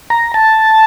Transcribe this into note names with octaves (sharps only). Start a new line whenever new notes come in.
A#5
A5